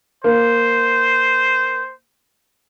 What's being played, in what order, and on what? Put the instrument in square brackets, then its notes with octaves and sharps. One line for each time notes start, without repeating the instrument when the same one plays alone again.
[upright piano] A#3 [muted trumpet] C5